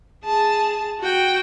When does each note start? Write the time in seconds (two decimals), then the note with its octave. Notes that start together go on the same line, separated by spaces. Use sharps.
0.25 G#4 A5
1.00 F#4 G5